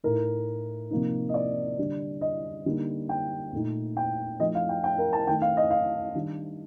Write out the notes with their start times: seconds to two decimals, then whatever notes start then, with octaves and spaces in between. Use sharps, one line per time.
0.04 A2 A3 D#4 A#4
0.91 C3 F3 A#3 D#4
1.29 D#5
1.34 D5
1.78 D3 G3 D4
2.21 D#5
2.66 D3 G3 A#3 D#4
3.09 G5
3.53 A#2 A3 D#4
3.97 G5
4.40 F3 A3 D#4 D#5
4.55 F5
4.69 G5
4.84 G5
4.98 A#4
5.13 A5
5.27 D#3 A3 D#4 G5
5.42 F5
5.57 D#5
5.71 F5
6.15 D#3 G3 D4